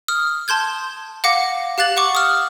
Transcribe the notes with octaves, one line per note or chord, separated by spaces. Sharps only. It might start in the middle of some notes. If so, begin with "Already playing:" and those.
D#6 F6
A5 C6 G6 G#6
F5 F#5 D6 A#6 C#7
G4 F5 F#6 A6 F#7
F#5 C#6 D6
D#6 F6